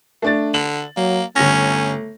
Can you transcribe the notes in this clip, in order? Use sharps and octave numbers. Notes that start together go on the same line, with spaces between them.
A3 D4 A6
D3 F#7
F#3 A#3
G1 A3 C#4 A#6